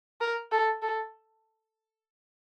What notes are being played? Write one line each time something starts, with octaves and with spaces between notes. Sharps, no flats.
A#4
A4
A4